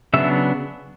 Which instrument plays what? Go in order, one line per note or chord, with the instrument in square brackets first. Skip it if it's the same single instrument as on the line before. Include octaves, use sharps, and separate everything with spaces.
[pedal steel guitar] C#3 F#3 B3 D4 E5